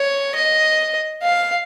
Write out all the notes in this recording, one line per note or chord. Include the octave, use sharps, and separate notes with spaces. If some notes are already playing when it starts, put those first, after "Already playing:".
Already playing: C#5
D#5
F5